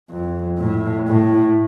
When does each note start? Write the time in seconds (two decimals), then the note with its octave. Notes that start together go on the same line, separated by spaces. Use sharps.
0.10 F2
0.59 A2
1.07 A2